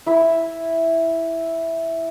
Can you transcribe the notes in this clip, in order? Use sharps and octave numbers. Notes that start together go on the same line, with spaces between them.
E4 E5